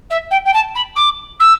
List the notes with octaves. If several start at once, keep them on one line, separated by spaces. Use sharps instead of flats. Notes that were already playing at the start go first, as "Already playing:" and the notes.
E5
G5
G5
A5
B5
D6
E6